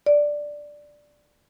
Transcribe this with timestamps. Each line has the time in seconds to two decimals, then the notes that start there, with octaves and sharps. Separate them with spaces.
0.06 D5